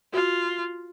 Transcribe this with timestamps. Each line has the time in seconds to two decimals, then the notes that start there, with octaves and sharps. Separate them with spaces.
0.13 F4 F#4